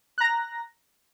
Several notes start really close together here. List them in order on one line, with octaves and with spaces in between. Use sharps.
F#6 A#5 A#6